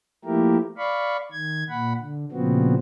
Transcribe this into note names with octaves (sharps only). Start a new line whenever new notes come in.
F3 A3 A#3 E4 G4 A#4
D5 F5 B5 C#6
D#3 G#6
A#2 F#5 B5
D3
A#2 C#3 F3 B3 C4 F#4